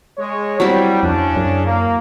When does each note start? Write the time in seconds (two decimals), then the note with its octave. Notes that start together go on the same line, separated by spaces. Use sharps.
0.18 G#3 C#5
0.60 F#3 G3 C4 E4
1.03 F2 C#3 C#4 D4
1.36 F#2
1.66 A#3